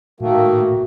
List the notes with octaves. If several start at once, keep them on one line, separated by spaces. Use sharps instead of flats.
A2 D#3 A3 A#3 F#4